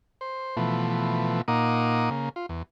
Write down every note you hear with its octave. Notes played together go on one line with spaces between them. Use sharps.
C5
B2 E3 F3 A3
A#2 A#3 D#4 F#5 D6 D#6
C#3 A#3
F4
E2